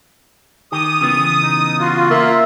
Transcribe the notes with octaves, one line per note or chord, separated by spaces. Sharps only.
D#3 G4 D#6
C#3 E3 B3
D#4
F4 F#4
A#3 E5